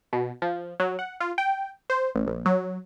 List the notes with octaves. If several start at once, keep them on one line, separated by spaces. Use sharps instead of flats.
B2
F3
F#3
F#5
F4
G5
C5
A1
A#1
F#3